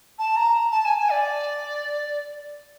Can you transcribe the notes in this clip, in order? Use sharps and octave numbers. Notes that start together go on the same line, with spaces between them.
A5
A#5
A5
G#5
G#5
D5